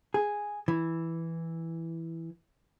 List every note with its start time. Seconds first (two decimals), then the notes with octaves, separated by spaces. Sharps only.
0.14 G#4
0.68 E3